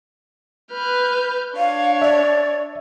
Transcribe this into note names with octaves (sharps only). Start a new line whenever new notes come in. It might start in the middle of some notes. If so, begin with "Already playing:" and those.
B4 F6 G6
D4 C#5 F5
D5 E5